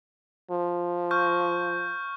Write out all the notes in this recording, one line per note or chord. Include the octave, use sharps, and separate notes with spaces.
F3
C#6 F6 G6